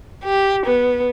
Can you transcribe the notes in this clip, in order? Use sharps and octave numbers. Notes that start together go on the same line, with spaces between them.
G4
B3